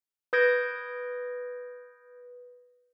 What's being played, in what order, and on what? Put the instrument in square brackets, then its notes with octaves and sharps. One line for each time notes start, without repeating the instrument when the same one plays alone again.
[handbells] B4 D#6 G6 G#6 A#6 D7